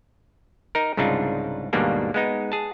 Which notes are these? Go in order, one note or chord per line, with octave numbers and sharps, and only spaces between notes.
D#4 A#4
C2 G#2 C#3 D4 D#4 F4
D#2 G#2 B2 G3 A#3 D4
G#3 B3 D#4
G#4 A5